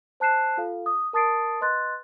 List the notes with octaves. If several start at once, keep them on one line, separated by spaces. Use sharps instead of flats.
C5 A5 F#6 C7 E7
F4 A4 F5
D#6
A#4 A5 D#6 A6 C7 D7
B4 D#5 C6 F#6 A6